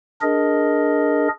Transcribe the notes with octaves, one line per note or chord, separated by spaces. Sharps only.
D4 G#4 A#4 D#5